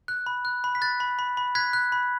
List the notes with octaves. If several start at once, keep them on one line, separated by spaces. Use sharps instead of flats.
F#6
B5
F#6
B5
B6
F#6 A6
B5
B5
B5
F#6 G#6 B6
F#6
B5